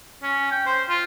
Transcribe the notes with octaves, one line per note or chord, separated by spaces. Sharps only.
C#4
G5
C5
F4